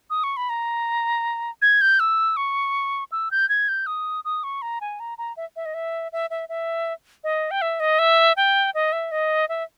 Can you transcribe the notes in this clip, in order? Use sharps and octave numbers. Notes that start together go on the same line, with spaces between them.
D#6
C#6
B5
A#5
G#6
G6
E6
C#6
E6
G6
G#6
G6
D#6
D#6
C#6
A#5
G#5
A#5
A#5
E5
E5
D#5
E5
E5
E5
E5
D#5
G5
E5
D#5
E5
G5
D#5
E5
D#5
E5